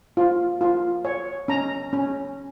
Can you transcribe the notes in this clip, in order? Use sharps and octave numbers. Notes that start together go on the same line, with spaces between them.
F4
F4
C#5
C#4 A#5
C#4